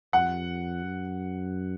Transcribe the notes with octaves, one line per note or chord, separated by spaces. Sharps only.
F2 F#5
F#2